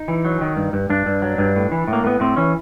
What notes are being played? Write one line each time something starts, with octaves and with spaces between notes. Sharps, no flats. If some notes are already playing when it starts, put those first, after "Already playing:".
Already playing: D#4
E3
F#3
D#3
G2
G2
G2 D4
G2
F#3
G2
A2
E3
A2
A#3
A2 B3
A2 C4
E3 C#4